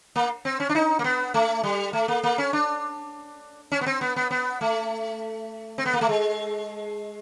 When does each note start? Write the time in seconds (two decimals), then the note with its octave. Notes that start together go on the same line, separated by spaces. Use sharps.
0.16 A#3
0.45 C4
0.60 C#4
0.69 D4
0.75 D#4
0.99 A#3
1.04 B3
1.34 A3
1.64 G3
1.93 A3
2.08 A#3
2.23 A#3
2.38 C#4
2.53 D4
3.72 C#4
3.81 B3
3.86 C4
4.01 B3
4.16 B3
4.31 B3
4.61 A3
5.78 C4
5.85 B3
5.93 A#3
6.01 A3
6.09 G#3